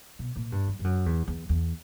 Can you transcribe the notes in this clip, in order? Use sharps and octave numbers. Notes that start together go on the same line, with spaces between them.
B2
A#2
G2
F#2
G2
F#2
E2
E2
E2